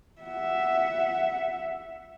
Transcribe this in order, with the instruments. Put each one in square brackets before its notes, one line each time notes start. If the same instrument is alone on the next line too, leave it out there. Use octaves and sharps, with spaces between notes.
[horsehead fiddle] E5 F#5